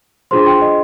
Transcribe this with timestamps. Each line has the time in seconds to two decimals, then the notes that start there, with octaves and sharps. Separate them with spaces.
0.31 D4 F4 G#4 C5 C6
0.46 G5
0.62 D#5